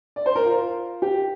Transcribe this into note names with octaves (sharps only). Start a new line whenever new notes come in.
D5
C5
A#4
F4
G4